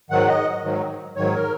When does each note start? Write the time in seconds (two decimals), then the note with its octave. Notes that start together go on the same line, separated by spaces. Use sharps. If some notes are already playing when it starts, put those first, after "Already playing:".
0.10 G#2 D#3 F#3 F#5
0.28 D#5
0.63 G#2 D#3 F#3
1.16 G#2 D#3 F#3 C#5
1.34 A#4